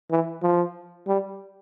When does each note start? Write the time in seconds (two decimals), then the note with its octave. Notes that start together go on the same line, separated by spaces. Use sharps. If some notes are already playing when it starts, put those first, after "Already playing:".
0.11 E3
0.43 F3
1.07 G3